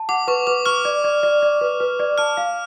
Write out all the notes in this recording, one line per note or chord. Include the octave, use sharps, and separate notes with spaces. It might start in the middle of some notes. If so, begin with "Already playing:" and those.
Already playing: A5
F#5 D6
B4 C#6
B4 D6
C#6 F6
D5
D5
D5
D5
B4
B4
D5
A5 F6
F5